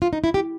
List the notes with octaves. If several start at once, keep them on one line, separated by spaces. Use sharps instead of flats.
F4
D#4
E4
G4